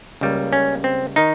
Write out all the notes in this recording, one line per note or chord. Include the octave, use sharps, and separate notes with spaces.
C#2 C#3 G3 A#3
C#4
C4
D#3 D#4